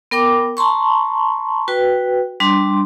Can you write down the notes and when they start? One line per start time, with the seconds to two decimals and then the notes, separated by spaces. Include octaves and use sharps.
0.11 B3 A#4 G5 D6
0.57 A5 A#5 C6 C#6
1.68 F#4 B4 G5
2.40 G3 D4 C6